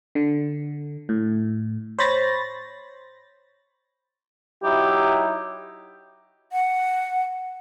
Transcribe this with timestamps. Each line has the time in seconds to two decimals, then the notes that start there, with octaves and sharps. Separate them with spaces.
0.15 D3
1.09 A2
1.99 C5 C#5 B5 A6 A#6
4.63 F#3 D#4 E4 G4
6.52 F#5